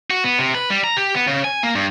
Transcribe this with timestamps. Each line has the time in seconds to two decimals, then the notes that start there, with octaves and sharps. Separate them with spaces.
0.11 F#4
0.24 B3
0.39 C3
0.55 B4
0.70 G3
0.84 A#5
0.96 G4
1.15 B3
1.27 C#3
1.44 G#5
1.63 A#3
1.75 G2